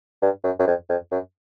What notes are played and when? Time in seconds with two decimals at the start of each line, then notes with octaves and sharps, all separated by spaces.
0.22 G2
0.44 F#2
0.59 F#2
0.67 F2
0.89 F2
1.11 F#2